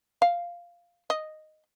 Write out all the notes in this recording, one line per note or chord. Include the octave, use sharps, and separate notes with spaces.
F5
D#5